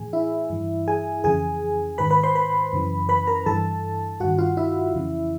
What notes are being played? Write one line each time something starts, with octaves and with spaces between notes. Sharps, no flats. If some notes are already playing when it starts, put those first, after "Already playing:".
Already playing: A2 E3 G#4 G#5
E4 E5
G2 E3
G#4 G#5
F2 C#3 E3 G#4 G#5
G#2 D#3 B4 B5
B4 B5
C5 C6
B4 B5
F#2 C#3 E3
B4 B5
A#4 A#5
G2 E3 A4 A5
G2 D#3 F#4 F#5
F4 F5
E4 E5
F2 C#3 E3